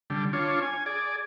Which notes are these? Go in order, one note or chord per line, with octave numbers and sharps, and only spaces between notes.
D3 G3
D4 F4 C#5
G#5
G#4 D5